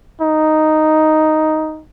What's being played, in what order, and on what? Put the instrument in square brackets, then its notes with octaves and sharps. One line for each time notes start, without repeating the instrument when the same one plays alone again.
[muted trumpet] D#4